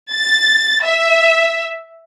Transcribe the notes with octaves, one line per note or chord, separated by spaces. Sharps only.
A6
E5